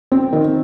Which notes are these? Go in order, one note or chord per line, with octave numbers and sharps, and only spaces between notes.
C4
D#3